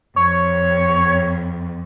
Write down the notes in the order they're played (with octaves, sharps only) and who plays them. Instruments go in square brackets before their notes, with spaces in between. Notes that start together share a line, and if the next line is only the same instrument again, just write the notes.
[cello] F2 [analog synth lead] C#5